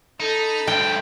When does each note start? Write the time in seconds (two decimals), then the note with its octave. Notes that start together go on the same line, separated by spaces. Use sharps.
0.20 D#4 A4 B5
0.67 D2 G2 G5